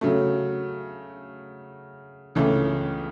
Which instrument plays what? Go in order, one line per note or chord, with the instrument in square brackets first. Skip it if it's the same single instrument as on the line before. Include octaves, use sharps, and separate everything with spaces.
[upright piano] C#3 F#3 A3
C#2 C#3 E3 A3